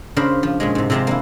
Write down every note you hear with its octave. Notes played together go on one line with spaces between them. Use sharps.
C#3 D4 A#4 C5 F5 B5
F3
A#2 C#3 G#3
G#2 C3
C3 F3 G#3 G4 A5 A#5
A#3 D4 E4